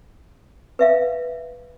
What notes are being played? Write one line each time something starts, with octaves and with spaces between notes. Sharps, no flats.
B4 E5 F5